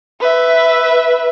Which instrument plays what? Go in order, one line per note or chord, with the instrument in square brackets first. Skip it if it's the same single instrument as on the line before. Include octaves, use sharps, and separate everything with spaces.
[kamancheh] B4 E5